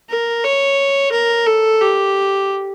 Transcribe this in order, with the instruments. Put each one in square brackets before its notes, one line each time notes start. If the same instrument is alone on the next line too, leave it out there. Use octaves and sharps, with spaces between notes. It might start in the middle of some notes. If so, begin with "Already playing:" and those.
[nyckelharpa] A#4
C#5
A#4
A4
G4